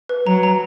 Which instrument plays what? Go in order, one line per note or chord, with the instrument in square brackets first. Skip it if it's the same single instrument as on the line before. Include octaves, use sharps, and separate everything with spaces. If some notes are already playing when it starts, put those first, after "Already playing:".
[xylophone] B4
[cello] F#3 [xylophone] A#5
[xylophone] A#5